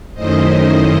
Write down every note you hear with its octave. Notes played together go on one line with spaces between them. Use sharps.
F#2 D#3 A3 C#4 E4 C5 D#5